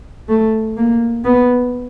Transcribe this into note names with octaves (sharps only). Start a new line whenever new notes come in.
A3
A#3
B3